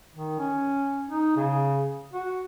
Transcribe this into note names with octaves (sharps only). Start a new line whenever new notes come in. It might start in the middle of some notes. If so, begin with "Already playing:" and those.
D#3
C#4
D#4
C#3
F#4